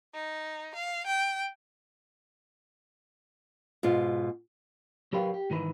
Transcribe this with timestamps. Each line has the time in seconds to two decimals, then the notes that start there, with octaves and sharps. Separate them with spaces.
0.14 D#4
0.75 F5
1.07 G5
3.83 G#2 B2 F4
5.13 F#3 G4 A#4 B4 F5 G5
5.34 G4
5.50 G#2 D#3 E3 B4